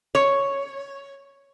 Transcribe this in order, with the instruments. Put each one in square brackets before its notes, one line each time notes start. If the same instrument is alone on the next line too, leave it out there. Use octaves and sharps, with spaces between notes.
[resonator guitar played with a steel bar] C#5